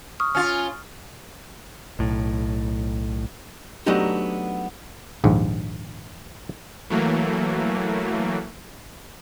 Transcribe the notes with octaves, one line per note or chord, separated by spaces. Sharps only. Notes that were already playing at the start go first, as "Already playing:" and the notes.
C#6 D#6 F6
C#4 F4 F6 A6
B1 A2
F#3 A3 B3 D4 D#4 G4
A#1 D#2 G#2
E3 F#3 A3 A#3